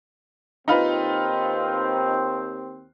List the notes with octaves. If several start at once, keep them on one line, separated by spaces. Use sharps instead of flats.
D#2 C4 D#4 F4 B4